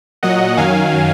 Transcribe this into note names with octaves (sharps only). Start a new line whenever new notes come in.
A#2 F#3 D#5 F#5
F#2 D#3 F#3 F5 G#5